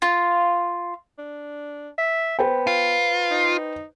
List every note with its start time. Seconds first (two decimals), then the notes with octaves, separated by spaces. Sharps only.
0.02 F4
1.19 D4
1.98 E5
2.39 B3 B4 C5 G5
2.67 F4
3.31 D#4